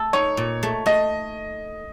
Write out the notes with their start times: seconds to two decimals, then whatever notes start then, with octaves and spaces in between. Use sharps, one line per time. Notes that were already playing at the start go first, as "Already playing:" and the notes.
Already playing: A3 A4
0.13 D#4 C#5
0.37 A#2
0.63 A3
0.86 A3 D#5